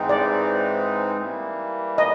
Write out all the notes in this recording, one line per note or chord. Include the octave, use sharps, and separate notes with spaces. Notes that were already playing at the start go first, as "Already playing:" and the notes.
Already playing: G#2 E3 G#3 C4 D#4
D5
E3 G3 A#3
D#5